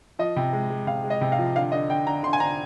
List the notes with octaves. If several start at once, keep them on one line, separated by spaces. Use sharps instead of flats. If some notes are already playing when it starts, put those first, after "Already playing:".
F3 D#5
C3
G#3
G#3
C3 F5
G#3
D#5
C3
F5
F3
D3 F5
D3 D#5
D3 G5
D3 A#5
D3 C6
G#5
D3 A#5